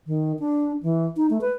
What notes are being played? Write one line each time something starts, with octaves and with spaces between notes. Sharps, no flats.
D#3
D4
E3
D#4
A3
B4